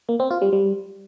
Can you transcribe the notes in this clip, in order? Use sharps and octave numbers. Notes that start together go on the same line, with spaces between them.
A#3
C4
F4
G3
G3